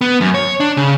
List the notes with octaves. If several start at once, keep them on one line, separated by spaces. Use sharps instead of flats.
B3
F#2
C#5
D4
C#3